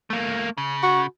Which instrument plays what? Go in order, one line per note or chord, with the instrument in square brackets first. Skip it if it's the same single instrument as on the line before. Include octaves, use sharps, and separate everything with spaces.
[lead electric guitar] A3 A#3
C#3
[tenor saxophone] F#4